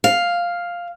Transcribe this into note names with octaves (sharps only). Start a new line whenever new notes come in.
F5